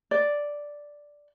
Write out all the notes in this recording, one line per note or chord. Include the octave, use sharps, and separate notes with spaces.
D5